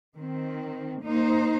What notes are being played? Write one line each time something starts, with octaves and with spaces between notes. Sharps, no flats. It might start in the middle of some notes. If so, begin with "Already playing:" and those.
D#3 C4
A#3 D#4 C5